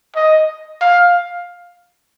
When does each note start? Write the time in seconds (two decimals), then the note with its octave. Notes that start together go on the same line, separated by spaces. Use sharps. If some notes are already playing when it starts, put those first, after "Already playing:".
0.16 D#5
0.81 F5